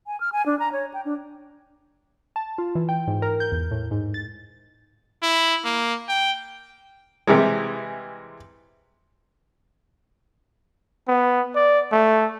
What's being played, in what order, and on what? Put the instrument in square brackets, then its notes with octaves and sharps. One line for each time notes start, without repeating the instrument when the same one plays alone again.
[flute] G#5
F6
G#5
D4
A#5
C#5
G5
D4
[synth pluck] A5
F4
E3
G5
G#2
A#4
G6
E2
A2
G#2
A6
[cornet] E4
A#3
G5
[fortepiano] C3 E3 G3 G#3
[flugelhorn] B3
D5
A3